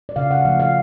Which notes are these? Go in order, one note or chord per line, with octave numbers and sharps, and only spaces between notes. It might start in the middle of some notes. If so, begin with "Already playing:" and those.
D5
C#3 F5
F#5
F3 A3 F5
F5